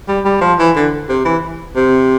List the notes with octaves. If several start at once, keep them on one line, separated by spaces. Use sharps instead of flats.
G3
G3
F3
E3
D3
C3
E3
C3